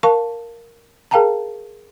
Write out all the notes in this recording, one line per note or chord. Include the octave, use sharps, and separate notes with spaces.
A#4 F5 A5 C#6
G#4 A#4 F5 G5 A5 A#5